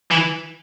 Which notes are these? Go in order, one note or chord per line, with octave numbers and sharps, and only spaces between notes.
E3